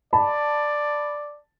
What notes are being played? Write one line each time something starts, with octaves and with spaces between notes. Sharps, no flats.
D5 A5 B5